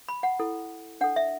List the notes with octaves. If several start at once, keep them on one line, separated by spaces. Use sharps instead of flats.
B5
F#5
E4 A4
D4 A4 F#5
E5